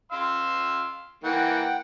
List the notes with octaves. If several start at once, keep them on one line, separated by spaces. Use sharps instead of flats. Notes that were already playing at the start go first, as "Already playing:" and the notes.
F5 C6 E6
E3 A#3 F#5 G5